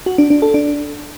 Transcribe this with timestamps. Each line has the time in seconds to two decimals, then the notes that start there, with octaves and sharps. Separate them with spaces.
0.06 F#4
0.18 D4
0.30 D4
0.42 A4
0.54 D4